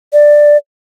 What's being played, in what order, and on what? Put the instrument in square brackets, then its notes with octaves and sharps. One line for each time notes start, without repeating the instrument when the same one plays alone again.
[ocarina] D5